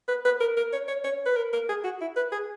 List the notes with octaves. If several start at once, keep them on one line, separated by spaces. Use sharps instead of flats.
B4
B4
A#4
A#4
C#5
C#5
C#5
B4
A#4
A#4
G#4
F#4
E4
B4
G#4